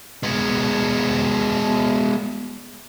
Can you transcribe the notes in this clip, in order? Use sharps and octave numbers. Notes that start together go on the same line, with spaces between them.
G#3 B3